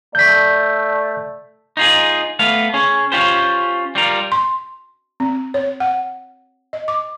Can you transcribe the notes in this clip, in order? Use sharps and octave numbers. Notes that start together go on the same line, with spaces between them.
A3 D5 G6 B6
D#4 F4 G#4
A3 B3 F5
C#4 G#4
C#4 F4 G4 C5
G3 F4 A#4
C6
C4
C#5
F#5
D#5
D6